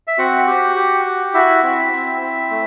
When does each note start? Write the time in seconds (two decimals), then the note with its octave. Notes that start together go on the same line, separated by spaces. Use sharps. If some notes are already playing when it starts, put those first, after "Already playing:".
0.08 E5
0.18 C4 F#4 F#5
0.47 G4
0.76 G4
1.05 G4
1.34 E4 F#4 E5
1.63 C4
1.92 C4
2.21 C4
2.50 A3